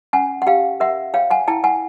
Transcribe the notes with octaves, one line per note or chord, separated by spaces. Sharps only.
C#4 F#5 G#5
F#5
G4 F5 G5
A#4 E5 F#5
C#5 F5 G5
F#5 G#5
E4 G5 A5
F#5 G#5